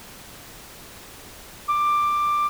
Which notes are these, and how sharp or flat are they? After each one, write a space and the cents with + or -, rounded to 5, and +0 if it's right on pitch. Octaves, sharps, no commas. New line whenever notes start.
D6 +10